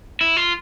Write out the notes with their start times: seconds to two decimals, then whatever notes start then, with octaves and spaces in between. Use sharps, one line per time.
0.21 E4
0.37 F4